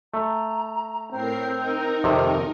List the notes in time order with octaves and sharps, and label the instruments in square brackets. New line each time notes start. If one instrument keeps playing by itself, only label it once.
[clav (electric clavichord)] A3 [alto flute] A#5
[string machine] A2 A#4 C7 [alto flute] C4
[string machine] D#4 A#4
[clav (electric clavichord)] F2 C3 D#3